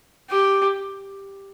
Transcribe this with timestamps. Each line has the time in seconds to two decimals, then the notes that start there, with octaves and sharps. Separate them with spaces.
0.29 G4